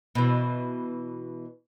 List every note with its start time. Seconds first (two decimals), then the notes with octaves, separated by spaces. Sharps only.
0.15 B2 E3